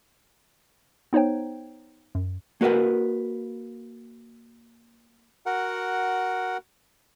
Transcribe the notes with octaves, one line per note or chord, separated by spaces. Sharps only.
B3 D#4 C5 C#5 G5
F#2
A#3 F#4 A#4 B4 F#5
F#4 A#4 F#5